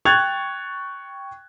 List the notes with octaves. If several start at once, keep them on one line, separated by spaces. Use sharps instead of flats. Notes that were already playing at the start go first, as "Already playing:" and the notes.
G5 C#6 F#6 G#6 A6 F7